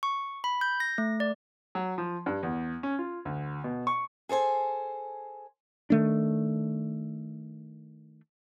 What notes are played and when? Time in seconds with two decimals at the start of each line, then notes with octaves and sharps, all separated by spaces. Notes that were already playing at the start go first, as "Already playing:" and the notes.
0.03 C#6
0.44 B5
0.61 G6
0.80 A#6
0.98 A3
1.20 D5
1.75 F#3
1.98 F3
2.26 G2
2.43 E2
2.83 C#4
2.99 F4
3.25 D2
3.64 B2
3.87 C#6
4.29 G#4 A4 C5 G#5
5.90 D#3 A3 D4